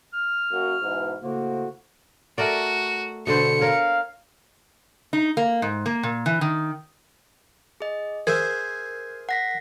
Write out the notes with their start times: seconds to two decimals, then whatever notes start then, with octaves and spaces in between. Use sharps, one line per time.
0.13 F6
0.52 F#2 A#3 F#4
0.82 G#2 B2 E3
1.23 A2 C#3 A#3 F#4 C5
2.38 A3 F#4 A#4 D5
3.27 B2 D3 C5 C#7
3.61 A#4 C#5 F5
5.13 D#4
5.37 A#3
5.62 G#2
5.86 A#3
6.03 A#2
6.26 E3
6.41 D#3
7.80 G#4 D#5
8.27 G#4 A#4 C5 E5 G6 G#6
9.29 F#5 A#6 B6